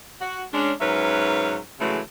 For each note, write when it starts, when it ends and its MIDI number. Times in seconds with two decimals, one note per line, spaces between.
0.21 0.43 66
0.52 0.72 56
0.52 0.72 61
0.52 0.72 62
0.80 1.57 44
0.80 1.57 54
0.80 1.57 61
0.80 1.57 70
0.80 1.57 71
0.80 1.57 76
1.79 2.00 49
1.79 2.00 52
1.79 2.00 54
1.79 2.00 56
1.79 2.00 57